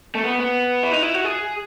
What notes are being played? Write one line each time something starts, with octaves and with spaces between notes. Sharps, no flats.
A3
B3
B3
E4
D#4
E4
F#4
G#4